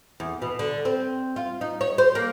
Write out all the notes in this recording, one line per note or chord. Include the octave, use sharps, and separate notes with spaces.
E2
B2
D3
C4
F4
D#4
C#5
C5
A#3